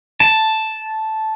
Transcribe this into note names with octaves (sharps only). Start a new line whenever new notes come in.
A5